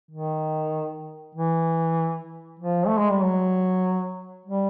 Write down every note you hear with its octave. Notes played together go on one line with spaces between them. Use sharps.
D#3
E3
F3
A3
G#3
G3
F#3
G3